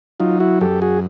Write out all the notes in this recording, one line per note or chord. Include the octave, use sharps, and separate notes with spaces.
F#3 D#4 F4
E4 F#4
F#2 G4 A4
F#4 G#4